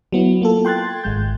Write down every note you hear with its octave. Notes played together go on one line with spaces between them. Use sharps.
F#3 B3 E4
A#3 F4 A4
G5 C6 F#6 G#6 A6
G#1 G#3 G6